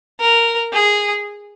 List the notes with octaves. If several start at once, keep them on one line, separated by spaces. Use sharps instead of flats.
A#4
G#4